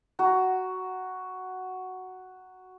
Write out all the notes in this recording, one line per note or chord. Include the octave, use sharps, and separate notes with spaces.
F#4 A#5